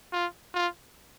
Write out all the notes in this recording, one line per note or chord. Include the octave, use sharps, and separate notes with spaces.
F4
F4